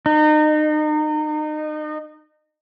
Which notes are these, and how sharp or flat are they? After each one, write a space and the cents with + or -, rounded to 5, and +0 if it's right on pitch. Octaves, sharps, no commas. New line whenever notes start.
D#4 -30